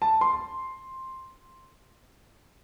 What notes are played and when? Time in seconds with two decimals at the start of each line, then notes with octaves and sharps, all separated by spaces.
0.02 A5
0.21 C6